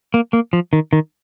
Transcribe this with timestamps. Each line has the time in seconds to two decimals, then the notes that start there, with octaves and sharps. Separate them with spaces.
0.14 A#3
0.33 A#3
0.53 F3
0.73 D#3
0.93 D#3